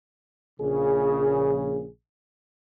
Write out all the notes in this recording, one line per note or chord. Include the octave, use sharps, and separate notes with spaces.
A#1 C#3 G#4